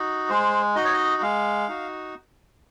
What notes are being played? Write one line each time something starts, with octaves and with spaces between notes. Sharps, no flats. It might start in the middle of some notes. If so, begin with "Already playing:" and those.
Already playing: D#4 F#4
G#3 C5
D#4 F#4 D#5
C#5
D#5
G#3 F5
D#4 F#4